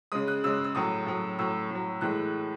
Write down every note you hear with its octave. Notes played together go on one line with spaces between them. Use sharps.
C#3 G#3 D#6
F#6
C#3 G#3 E6
E6
A2 F#3 D#6
A2 F#3
A2 F#3 E6
A2 F#3
A2 E3 G#3 F#6